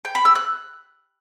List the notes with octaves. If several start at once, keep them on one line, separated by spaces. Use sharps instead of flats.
G5
B5
E6
F#6